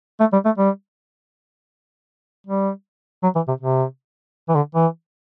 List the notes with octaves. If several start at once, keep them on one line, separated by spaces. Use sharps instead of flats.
A3
G3
A3
G3
G3
F#3
E3
C3
C3
E3
D3
E3